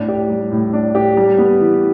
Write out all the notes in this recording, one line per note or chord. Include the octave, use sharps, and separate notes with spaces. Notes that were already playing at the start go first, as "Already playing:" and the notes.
Already playing: A2 D4
G4
G3
A2
D4
G4
G3
B3
E3